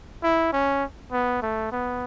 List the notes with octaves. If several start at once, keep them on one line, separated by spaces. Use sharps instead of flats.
E4
C#4
B3
A3
B3